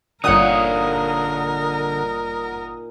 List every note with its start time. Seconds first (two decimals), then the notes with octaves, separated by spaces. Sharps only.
0.24 G1 A#2 D3 D#4 A#4 C#5 F#5 D#6